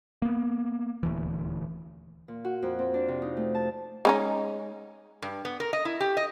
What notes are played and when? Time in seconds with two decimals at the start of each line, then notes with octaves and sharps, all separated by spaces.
0.22 A#3 B3
1.03 D#1 D2 E3
2.28 A#2
2.45 F#4
2.63 F2
2.79 C4
2.94 D4
3.08 C3
3.22 D#4
3.37 A3
3.55 A5
4.05 G#3 C#4 D#4
5.22 G2
5.45 B3
5.60 A#4
5.73 D#5
5.85 E4
6.00 G4
6.17 D#5